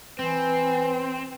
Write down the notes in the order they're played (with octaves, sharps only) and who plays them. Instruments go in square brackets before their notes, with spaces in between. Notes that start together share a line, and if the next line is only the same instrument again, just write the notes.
[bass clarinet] E3 [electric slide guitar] C4 [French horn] B4